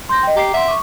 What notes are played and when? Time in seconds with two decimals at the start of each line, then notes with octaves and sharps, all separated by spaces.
0.09 C6 G6 A#6
0.23 D#5 G5
0.36 G4 A#5 D6 C7
0.54 E5 F#5 C6
0.68 C#6 D6